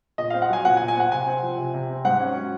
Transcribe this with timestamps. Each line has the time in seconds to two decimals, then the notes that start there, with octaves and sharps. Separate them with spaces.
0.18 A#2 D#5
0.30 C4 F5
0.42 F#5
0.50 F#3 G#5
0.65 A#2 F#5
0.77 G#5
0.80 A#2
0.88 G#5
0.96 C4 F#5
1.11 C3 G#5
1.27 C4
1.43 F3
1.58 C3
1.74 C3
1.89 C4
2.05 G#2 F#5
2.20 C#4
2.36 F#3